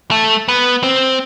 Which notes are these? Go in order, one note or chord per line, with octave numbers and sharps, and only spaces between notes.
A3
B3
C4